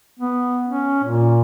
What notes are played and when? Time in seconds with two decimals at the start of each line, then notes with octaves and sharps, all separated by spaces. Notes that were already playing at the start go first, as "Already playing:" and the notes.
0.20 B3
0.67 C#4
1.04 A#2